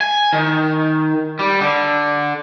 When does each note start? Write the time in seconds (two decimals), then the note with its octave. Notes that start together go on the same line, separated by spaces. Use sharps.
0.01 G#5
0.33 D#3
1.39 G3
1.61 D3